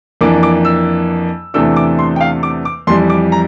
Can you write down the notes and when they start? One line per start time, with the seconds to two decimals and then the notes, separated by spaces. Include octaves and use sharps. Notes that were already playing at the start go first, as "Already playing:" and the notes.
0.21 F2 E3 A#3 D4 D6
0.43 D6
0.65 E6
1.54 E2 C3 E3 A3 D4 E6
1.76 D6
1.99 C6
2.16 G5
2.21 F5
2.43 D6
2.65 D6
2.87 F2 E3 G3 C6
3.10 D6
3.32 A#5